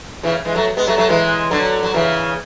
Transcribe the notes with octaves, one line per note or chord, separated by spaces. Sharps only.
C#3 E3
E3 G#3
F#3 A3
G#3 B3
F#3 A3
F#3 A3
E3 G#3
D3 F#3
F#3
C#3 E3